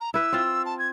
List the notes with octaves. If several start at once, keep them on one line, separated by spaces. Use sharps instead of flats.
A#5
E4 B4 E6
C4 F4
A5
G#6